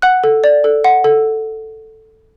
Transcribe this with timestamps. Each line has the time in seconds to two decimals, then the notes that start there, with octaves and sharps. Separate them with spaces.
0.02 F#5 F#6
0.24 A4
0.44 D5
0.64 A4
0.84 F#5
1.04 A4